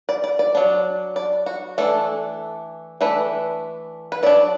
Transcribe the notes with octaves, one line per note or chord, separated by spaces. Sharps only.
D5
D5
D5
F#3 D4
D5
F#4
E3 A3 D4 A4
E3 A3 D4 B4
B4
F#3 D4 D5